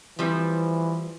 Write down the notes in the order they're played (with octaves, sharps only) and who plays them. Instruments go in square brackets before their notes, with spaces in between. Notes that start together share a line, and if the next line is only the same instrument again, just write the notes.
[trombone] E3 [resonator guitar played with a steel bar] F3 G3 C4